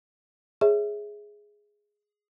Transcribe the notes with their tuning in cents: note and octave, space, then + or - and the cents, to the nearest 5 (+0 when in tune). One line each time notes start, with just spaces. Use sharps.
G#4 +0 C#5 +0 E5 +0